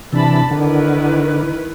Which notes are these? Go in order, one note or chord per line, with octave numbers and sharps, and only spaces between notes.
C3 E3 D4 A5 B5
D3 D#3 E4 B4